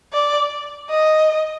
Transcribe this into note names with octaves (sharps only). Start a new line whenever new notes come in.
D5
D#5